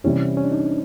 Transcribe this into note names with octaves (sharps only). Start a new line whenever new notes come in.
C3 E3 G3 C4 C#4 E4
C#4
D4
D#4